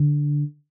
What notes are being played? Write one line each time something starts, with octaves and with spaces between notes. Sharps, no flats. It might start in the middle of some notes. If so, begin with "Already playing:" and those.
Already playing: D3